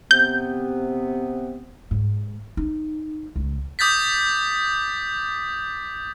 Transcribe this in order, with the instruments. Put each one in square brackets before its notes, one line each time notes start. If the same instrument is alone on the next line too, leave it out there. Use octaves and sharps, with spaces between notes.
[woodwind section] C3 B3 [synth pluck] G6
[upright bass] G#2
D#4
C#2
[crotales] D6 D#6 G6 A6 B6